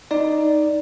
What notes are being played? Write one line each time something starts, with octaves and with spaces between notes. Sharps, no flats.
D#4 D5